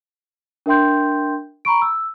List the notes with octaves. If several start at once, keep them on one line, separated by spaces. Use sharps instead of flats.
D4 A#4 E5 G5 C6 G6
A#5 B5 C#6 D7
E6